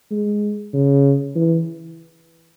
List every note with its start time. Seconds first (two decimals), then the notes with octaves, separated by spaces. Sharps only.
0.11 G#3
0.74 C#3
1.35 E3